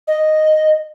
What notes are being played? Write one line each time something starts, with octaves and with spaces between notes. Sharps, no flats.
D#5